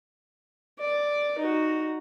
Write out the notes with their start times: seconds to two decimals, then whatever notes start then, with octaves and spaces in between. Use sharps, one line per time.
0.79 D5
1.39 D#4 F#4